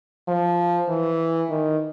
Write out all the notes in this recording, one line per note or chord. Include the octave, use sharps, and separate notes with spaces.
F3
E3
D#3